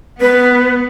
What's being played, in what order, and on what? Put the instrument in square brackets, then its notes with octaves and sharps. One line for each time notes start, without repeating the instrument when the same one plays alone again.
[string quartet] B3 [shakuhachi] B4